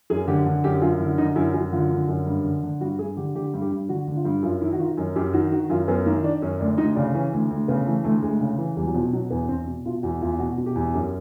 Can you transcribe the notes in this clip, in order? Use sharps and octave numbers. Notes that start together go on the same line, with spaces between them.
F#2 G#4
D3 G4
D3
F#2 G4
F#2 F4
D3 E4
D3 D#4
F#2 E4
F#2 F#4
D3 F4
D3
F#2
G2
D3
D3
G2 F#4
G2 G#4
D3 G4
D3 G4
G2
G4
G2
D3 F#4
D3
F4
G2
F#2 F4
D#3 E4
F#4
D#3 F4
F#2
F#2 G4
D#3 F#4
D#3 F#4
F#2 F4
F#2 B3
D#3 A#3
D#3 D4
F#2 C#4
D2 D4
D2 D#4
C#3 D4
E3 C#4
D2
D2
C#3 B3
E3 A3
D2 A3
D2 G#3
C#3
E3
E2 G3
F#3
B2 F3
B2 F#3
E2 B3
E2 C4
B2
B2 F4
E2 F#4
E2 F4
B2 F#4
B2
G4
E2
F#2 G4